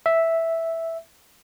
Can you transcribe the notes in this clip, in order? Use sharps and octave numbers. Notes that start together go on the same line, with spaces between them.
E5